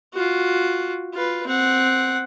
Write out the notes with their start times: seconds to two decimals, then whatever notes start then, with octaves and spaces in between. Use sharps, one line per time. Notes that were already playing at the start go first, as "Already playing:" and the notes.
0.14 F4 F#4
1.13 F4 B4
1.47 C4 F#5